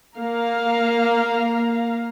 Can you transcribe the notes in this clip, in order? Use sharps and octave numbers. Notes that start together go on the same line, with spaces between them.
A#3 F5 A#5